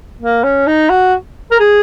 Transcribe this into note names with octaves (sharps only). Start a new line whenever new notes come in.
A#3
C#4
D#4
F#4
A#4
G#4